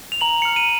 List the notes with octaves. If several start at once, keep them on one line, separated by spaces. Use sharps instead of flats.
F7
A#5 F#7
F6 C#7
D#7